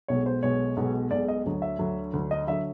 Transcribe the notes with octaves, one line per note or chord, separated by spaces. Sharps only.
B1 B2 G#3 C#5
C5
B1 B2 G#3 C#5
B1 B2 G#3
B1 B2 G#3 D5
D#5
D2 D3 F#3
E5
D2 D3 F#3
D2 D3 F#3
D#5
D3 F#3 E5